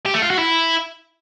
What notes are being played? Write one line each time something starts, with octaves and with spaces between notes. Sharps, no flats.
G4
A3
F4
F#4
E4